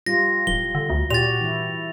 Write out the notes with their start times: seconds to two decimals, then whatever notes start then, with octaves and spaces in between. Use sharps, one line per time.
0.06 G3 F4 A#6
0.47 D1 G7
0.75 D3
0.90 D2
1.10 A#2 F#4 G4 A6 F7
1.41 E3 E4